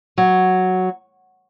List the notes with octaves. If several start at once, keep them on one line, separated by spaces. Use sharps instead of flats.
F#3